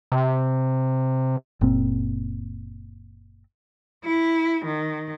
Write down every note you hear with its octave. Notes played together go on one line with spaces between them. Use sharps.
C3
F#1 A#2 C4
E4
D#3